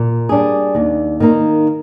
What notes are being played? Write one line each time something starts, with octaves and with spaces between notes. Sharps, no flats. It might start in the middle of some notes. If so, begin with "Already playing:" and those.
Already playing: A#2
G3 D4 G#4
D#2
D#3 A#3 D#4